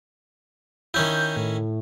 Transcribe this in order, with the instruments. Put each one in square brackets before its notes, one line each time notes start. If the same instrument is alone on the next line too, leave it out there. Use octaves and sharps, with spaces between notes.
[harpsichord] D#3 C#4 E4 [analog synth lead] G6
[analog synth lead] A2